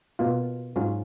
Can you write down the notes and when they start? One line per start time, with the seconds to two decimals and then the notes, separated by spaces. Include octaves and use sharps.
0.19 B2 A#3 F4
0.76 G#2 F#3 C#4 F4